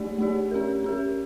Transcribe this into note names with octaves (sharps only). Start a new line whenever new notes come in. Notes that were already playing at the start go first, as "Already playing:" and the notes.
Already playing: A3 D4 G4 D5
A3 D4 G4 D5
C#4 G4 A#4
C#4 G4 A#4